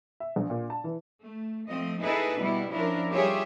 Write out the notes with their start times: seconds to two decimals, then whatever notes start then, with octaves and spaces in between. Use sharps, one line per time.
0.20 E5
0.36 A#1
0.50 A#2
0.70 A5
0.84 E3
1.21 A3
1.66 F3 A3 C4 D#5
2.01 D#4 E4 G#4 A4 B4 E5
2.38 B2 G3 B3 E4
2.70 F3 C#4 D4 E4 A#4
3.13 G3 F4 G4 G#4 C#5 E5